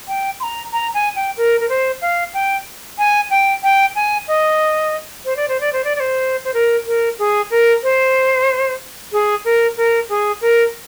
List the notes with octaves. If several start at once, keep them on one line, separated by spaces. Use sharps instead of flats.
G5
C6
A#5
A#5
G#5
G5
A#4
A#4
C5
F5
G5
G#5
G5
G5
G#5
D#5
C5
D5
C5
D5
C5
D5
D5
C5
C5
A#4
A#4
G#4
A#4
C5
G#4
A#4
A#4
G#4
A#4